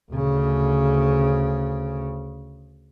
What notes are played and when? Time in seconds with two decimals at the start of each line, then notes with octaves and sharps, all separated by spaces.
0.11 D2 C#3